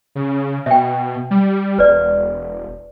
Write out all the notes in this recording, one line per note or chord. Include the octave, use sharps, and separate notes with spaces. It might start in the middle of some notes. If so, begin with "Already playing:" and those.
C#3
B2 E5 G5
G3
E1 B4 D5